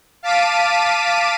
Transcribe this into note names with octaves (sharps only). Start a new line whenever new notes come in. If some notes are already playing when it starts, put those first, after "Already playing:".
F5 A5 D6 B6 D7 D#7